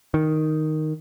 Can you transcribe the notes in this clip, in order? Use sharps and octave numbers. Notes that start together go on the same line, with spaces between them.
D#3